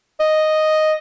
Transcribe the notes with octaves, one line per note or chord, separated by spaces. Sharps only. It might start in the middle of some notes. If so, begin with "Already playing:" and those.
D#5